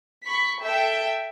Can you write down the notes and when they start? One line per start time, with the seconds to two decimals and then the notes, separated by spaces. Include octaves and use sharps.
0.25 B5 C#6 B6
0.62 A4 E5 G5